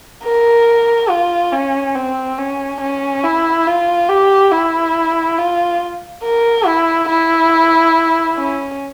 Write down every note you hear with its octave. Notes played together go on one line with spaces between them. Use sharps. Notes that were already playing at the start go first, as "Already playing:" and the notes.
A#4
F4
C#4
C4
C#4
C#4
E4
F4
G4
E4
F4
A#4
E4
E4
C#4